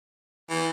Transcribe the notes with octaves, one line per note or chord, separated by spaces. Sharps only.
E3